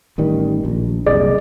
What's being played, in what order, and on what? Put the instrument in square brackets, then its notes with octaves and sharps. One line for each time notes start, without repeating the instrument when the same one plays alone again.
[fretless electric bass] A1 D#3 G3
A#1
[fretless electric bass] F#1 C2 [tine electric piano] G#4 D5 D#5